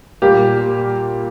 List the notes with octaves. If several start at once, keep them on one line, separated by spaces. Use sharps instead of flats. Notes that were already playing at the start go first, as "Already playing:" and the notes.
A#2 G3 A#3 G4